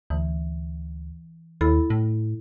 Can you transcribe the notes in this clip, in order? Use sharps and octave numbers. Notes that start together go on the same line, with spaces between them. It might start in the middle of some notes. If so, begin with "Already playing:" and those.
D2 E3
D#2 E4 A4 B5
A2